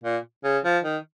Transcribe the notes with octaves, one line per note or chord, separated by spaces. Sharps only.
A#2
C#3
F3
D#3